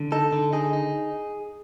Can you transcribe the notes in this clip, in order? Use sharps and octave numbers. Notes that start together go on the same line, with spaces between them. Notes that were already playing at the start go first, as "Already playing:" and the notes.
Already playing: D3
D#4 A4
D3
D#4 G#4
D#4